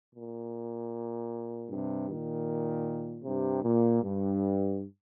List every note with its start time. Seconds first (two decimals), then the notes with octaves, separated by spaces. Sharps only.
0.15 A#2
1.69 G2 C3
2.08 A#2 D#3
3.24 G2 C3
3.63 A#2
4.03 G2